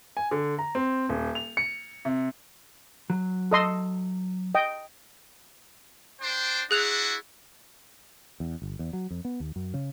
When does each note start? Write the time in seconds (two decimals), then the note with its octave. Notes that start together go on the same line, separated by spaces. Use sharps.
0.17 G#5
0.31 D3
0.59 A#5
0.75 C4
1.09 D#1
1.35 F7
1.57 C#7
2.05 C3
3.10 F#3
3.51 A4 D#5 C6
4.55 D#5 G5
6.21 D4 C5 G5
6.71 D4 E4 F#4 G#4 F#6 F7
8.40 E2
8.62 G1
8.79 E2
8.93 F#3
9.11 F2
9.25 B3
9.40 D#2
9.56 F#2
9.74 C#3